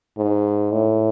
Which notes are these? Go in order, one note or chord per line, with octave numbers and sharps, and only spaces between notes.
G#2
A2